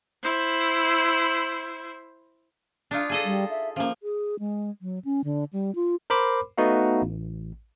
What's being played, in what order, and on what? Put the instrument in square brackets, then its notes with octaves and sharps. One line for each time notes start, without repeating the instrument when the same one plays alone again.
[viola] E4 C5
[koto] D4 D#4 F4
G#4 A4 D#5
[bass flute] G3
E5
[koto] F3 A#3 [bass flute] C#4
[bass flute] G#4
G#3
F#3
C#4
D3
G3
F4
[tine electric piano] A#4 C5 B5 D6
A3 B3 D#4 F#4 F5
A1